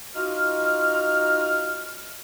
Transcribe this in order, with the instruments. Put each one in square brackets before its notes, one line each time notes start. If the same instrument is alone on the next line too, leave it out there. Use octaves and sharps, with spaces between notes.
[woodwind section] D#4 F4 F#4 D#5 F6